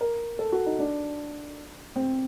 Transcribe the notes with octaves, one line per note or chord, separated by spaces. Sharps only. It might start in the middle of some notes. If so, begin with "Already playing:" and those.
A#4
A4
F#4
D#4
D4
C4